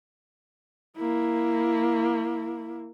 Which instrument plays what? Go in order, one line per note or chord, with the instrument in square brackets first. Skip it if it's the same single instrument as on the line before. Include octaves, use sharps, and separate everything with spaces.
[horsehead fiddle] A#3 E4